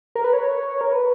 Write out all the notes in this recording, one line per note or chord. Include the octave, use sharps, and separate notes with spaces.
A#4
B4
C#5
A#4
B4